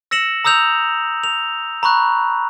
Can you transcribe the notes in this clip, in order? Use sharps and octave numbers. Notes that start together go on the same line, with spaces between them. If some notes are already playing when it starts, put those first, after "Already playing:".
E6 A#6 C#7 E7 F#7
A#5 D#6 E6 G6 F7
F7
A#5 B5 C#6 F#6